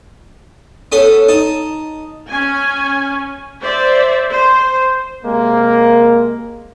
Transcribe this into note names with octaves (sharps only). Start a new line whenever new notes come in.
B3 C#4 A4
D#4 A5
C#4 G#5
C5 D5 E5
C5
C3 G#3 A#3